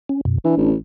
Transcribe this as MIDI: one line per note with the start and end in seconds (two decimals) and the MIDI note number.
0.09 0.21 61
0.25 0.38 42
0.25 0.38 47
0.45 0.54 52
0.45 0.71 62
0.57 0.74 33